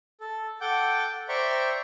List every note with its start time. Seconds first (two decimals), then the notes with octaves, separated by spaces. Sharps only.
0.21 A4
0.61 A4 F#5 G5 D6 G6
1.29 C5 D5 E5 G5 A#5 C#6